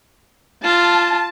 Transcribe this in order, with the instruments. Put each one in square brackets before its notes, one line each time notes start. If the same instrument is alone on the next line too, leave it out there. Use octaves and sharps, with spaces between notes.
[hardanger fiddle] F4 [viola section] A5